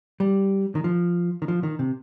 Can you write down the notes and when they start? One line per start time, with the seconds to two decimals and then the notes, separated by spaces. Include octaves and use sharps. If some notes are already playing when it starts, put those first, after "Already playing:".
0.20 G3
0.75 D#3
0.84 F3
1.42 D#3
1.48 F3
1.63 D#3
1.79 C3